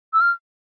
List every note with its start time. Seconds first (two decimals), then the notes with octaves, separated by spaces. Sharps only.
0.13 E6
0.21 F6